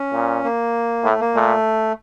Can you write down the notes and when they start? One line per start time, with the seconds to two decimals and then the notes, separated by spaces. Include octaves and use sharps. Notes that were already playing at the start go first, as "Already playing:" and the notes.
Already playing: C#4
0.13 A#2
0.44 A#3
1.04 A2 A3
1.20 A#3
1.35 A#2 A3